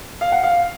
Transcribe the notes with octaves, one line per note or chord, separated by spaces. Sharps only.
F5
F#5
F5